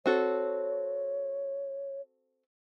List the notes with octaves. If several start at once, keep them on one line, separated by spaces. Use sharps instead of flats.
C4 F#4 A4 C#5